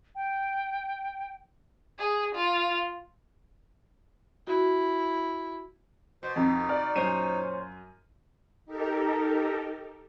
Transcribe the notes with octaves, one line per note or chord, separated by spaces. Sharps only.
G5
G#4
F4
E4 F#4
B2 C5
F2 D#4
D5 F6
F#2 A#2 C5 C#5 D#7
D#4 G4 A4 A#4